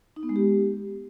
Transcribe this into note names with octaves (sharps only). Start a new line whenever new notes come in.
D#4
B3
G#3
G4